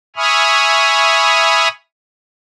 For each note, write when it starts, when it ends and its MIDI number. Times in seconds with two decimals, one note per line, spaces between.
0.16 1.68 76
0.16 1.68 80
0.16 1.68 83
0.16 1.68 85
0.16 1.68 87
0.16 1.68 89